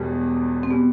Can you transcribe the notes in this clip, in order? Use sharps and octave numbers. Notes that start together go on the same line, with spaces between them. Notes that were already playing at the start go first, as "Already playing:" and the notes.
Already playing: E1 E2 B2 G3 B3
C4
B2 G3 B3